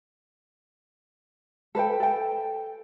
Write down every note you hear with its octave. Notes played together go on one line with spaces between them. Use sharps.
A4 B4 C5 G5
A4 G5